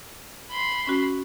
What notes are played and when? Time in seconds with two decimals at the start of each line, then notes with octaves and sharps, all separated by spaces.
0.50 B5 C6
0.87 C#4 F#4